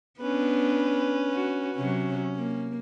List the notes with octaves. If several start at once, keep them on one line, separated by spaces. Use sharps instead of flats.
B3 C#4 D4 B4
F#4
C3 F#3 C#4
A#3